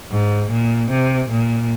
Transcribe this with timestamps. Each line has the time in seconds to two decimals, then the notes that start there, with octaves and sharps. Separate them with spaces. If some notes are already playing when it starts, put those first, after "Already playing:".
0.11 G#2
0.51 A#2
0.90 C3
1.30 A#2